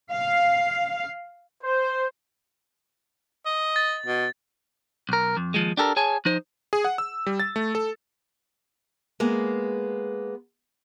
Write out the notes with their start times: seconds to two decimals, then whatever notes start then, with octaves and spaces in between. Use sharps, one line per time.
0.11 F5
1.63 C5
3.46 D#5
3.76 A6
4.06 B2
5.09 B1 A#4
5.37 F2
5.54 D#2 F3 G#3
5.77 D4 G4 A4 A#4
5.96 G#4 C#5 G#5 A5
6.25 F3 D#4 C5
6.73 G#4
6.85 F#5
6.98 E6
7.26 G3
7.40 A6
7.56 A3
7.75 A4
9.20 G#3 A#3 B3